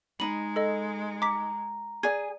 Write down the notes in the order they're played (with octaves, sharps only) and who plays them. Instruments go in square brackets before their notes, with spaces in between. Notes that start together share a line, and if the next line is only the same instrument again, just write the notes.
[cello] G#3 [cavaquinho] D#4 B5 [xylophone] F#7
[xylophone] A4 D#5
[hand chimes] A#5 [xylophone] D6 B6
[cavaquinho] G#4 G#5 [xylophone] D5 G#6